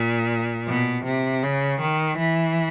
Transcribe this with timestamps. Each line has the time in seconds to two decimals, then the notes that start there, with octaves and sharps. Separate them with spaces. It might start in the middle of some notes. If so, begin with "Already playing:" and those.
Already playing: A#2
0.68 B2
1.06 C3
1.43 C#3
1.81 D#3
2.18 E3